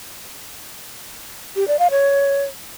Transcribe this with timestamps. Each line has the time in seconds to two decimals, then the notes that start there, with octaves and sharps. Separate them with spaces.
1.56 G4
1.68 D5
1.79 F5
1.91 C#5